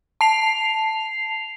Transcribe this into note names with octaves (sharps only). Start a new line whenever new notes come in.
A5 C7 F7